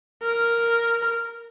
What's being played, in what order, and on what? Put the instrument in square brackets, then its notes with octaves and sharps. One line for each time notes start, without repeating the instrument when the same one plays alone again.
[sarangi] A#4